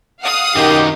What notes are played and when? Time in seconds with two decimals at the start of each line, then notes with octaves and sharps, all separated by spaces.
0.21 F5 F#5 D#6
0.56 F#2 D#3 D#4 G4